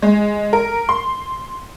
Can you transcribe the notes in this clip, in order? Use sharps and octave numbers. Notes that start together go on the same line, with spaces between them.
G#3
A#4
C6